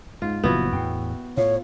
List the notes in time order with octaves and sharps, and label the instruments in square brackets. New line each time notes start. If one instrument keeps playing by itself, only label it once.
[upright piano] G#2 [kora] F4
[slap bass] F#1 A#2 [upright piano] F3 [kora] B3 E4 F#4
[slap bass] E2 A2 [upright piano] G5
[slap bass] A2 [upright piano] F4 [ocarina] C#5